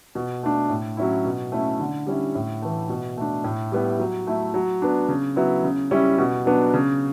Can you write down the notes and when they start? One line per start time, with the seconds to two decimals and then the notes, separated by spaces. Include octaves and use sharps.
0.15 B2
0.43 A3 D4
0.70 A2
0.97 F#3 C#4 E4
1.25 B2
1.52 A3 C#4 E4
1.80 D3
2.07 G3 C#4 E4
2.35 A2
2.62 E3 A3
2.89 B2
3.17 A3 D4
3.44 A2
3.72 G3 B3 E4
3.99 F#3
4.27 A3 E4
4.54 F#3
4.82 B3 D4
5.08 C#3
5.36 F#3 B3 E4
5.64 C#3
5.91 G3 C#4 E4
6.18 B2
6.46 F#3 B3 D4
6.74 C#3